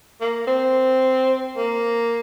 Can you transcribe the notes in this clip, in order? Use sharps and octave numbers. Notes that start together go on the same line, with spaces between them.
A#3
C4
A#3